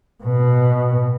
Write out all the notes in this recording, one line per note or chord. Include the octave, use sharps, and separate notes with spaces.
B2